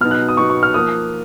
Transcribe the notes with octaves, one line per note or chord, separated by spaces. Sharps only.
B2 F#3 B3 D#4 F6
F#6
D#6
B2 F#3 B3 D#4 C#6
C#6
F6
F3 A#3 D#6